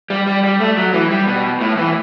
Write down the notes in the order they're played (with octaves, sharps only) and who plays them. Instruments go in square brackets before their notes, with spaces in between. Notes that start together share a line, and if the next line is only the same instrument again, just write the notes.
[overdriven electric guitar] G3
G3
G3
A3
F#3
E3
G3
B2
A2
E3